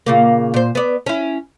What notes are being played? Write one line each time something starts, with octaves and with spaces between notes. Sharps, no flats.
A#2 C#3 A#3
A#2 C5
B3 D5
C#4 E4